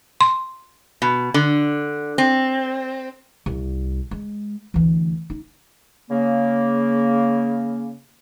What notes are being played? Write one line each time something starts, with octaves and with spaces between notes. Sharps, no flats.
C6
B2
D3
C4
C2
G#3
D2 E3
D#4
C#3 A#3